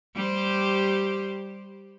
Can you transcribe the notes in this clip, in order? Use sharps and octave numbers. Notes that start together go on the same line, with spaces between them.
G3 G4 C5